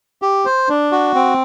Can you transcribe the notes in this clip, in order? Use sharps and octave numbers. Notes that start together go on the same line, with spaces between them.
G4
C5
D4
F#4
C4